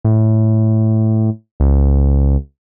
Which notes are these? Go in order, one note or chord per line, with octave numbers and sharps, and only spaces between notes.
A2
C#2